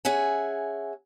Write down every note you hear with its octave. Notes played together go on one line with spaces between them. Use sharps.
C#4 G#4 E5 F#5 G#5